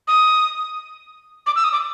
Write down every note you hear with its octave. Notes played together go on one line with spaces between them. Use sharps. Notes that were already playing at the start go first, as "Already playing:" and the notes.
D#6
D6
E6
D#6
D6